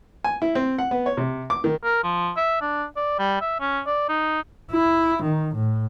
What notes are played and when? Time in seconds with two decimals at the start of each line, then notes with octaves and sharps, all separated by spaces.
0.24 G#5
0.42 E4
0.55 C4
0.78 F#5
0.91 B3
1.06 C#5
1.17 C3
1.50 D6
1.64 D#3
1.84 A#4
2.03 F3
2.37 E5
2.61 D4
2.96 D5
3.19 G3
3.41 E5
3.60 C#4
3.86 D5
4.09 D#4
4.72 E4
5.23 D#3
5.55 A2